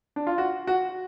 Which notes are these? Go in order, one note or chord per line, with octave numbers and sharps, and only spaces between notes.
D4
F4
F#4
F#4